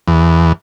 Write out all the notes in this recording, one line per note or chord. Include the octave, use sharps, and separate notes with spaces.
E2